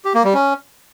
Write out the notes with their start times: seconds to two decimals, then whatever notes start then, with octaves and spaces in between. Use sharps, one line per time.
0.05 G4
0.14 A#3
0.24 G3
0.34 C#4